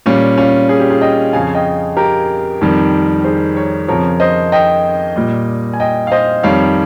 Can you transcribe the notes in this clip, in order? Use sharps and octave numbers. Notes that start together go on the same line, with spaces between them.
A#2 G3 C#4 F4
C#4 F4
G#4
G4
F4 G#4
D#5 G5
F2 C#3 F3 F5 G#5
D#5 G5
G4 A#4
F2 D#3 G3
G#4 C5
A#4 C#5
F2 C#3 F3 A#4 C#5
C5 D#5
D#5 G5
A#2 G3
G#5
D#5 G5
F5
C5 D#5
F2 D#3 G3 C#5 F5